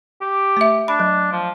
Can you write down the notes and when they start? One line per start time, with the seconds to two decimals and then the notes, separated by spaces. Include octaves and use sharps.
0.21 G4
0.57 A3 E5
0.88 D4 B5
1.00 F#3
1.32 F3